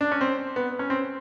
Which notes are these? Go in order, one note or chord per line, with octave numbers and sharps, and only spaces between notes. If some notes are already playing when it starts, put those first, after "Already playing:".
D4
C#4
C4
B3
C#4
C4